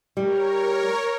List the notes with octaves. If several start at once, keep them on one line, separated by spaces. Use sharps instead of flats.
G3 A#4 C#5